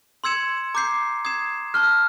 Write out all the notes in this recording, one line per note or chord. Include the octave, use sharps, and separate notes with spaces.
C6 E6 G#6 C#7 E7
A#5 D6 G6 C7
D#6 G#6 C7 E7
A5 C#6 F6 F#6